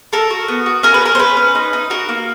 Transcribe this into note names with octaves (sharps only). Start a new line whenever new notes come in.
A4 A#4
F#4
B3
F#4
C#4 A#4
B4
C#4 A#4
C5
C#4 B4
C#4
D#4
D#4
F#4 A#4
A#3